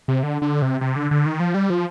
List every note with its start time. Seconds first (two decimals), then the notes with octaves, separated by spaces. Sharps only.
0.08 C3
0.23 D3
0.42 D3
0.62 C3
0.81 C3
0.96 D3
1.11 D3
1.26 D#3
1.40 F3
1.54 G3
1.70 F3